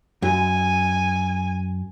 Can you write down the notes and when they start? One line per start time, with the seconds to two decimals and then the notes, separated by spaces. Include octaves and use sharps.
0.22 F#2 G#5